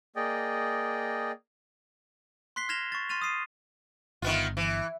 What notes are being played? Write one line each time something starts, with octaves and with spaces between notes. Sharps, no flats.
A#3 G#4 D5 D#5 G5
C6 F#6 B6 C7 G7
F6 G#6 A#6 E7 F7 G7
C#6 A6
C6 F6 A6 D#7 F7
D#6 F6 C7 D#7
G1 D#3 B3 F4
E3